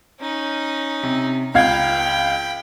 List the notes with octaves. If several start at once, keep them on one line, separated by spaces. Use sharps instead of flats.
C#4 D#4
C3
C#2 F5 G5 B5 G#6